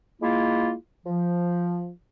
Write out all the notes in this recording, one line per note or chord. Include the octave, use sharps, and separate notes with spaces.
G#3 A#3 E4 F4
F3